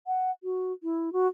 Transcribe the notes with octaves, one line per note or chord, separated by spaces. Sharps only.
F#5
F#4
E4
F#4